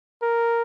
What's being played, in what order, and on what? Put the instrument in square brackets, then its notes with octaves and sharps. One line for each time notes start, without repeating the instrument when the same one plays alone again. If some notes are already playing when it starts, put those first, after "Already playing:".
[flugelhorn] A#4